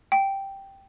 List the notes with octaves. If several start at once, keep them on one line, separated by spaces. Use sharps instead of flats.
G5